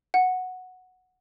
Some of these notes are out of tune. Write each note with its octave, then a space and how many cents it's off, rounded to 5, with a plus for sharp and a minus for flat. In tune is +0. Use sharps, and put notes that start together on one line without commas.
F#5 -5